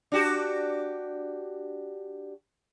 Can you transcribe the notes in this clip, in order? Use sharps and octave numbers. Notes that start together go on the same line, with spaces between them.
D4 F#4 G4